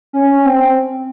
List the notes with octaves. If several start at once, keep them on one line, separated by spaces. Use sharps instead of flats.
C#4
C#4
C4
C4